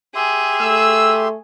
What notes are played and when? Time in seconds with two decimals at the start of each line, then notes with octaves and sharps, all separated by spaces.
0.15 G4 G#4 E5 C6
0.61 A3 E6